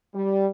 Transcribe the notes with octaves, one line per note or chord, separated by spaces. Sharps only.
G3